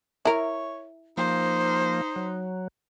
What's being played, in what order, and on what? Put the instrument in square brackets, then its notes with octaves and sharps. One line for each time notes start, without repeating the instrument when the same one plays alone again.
[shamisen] E4 A#4 [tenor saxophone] C#5
[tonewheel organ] F3 A#3 [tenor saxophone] D#4 [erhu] C5
[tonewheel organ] F#3